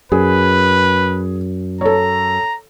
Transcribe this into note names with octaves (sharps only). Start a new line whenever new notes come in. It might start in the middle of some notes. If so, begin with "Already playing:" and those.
F#2 G#4 B4
A4 C#5 A#5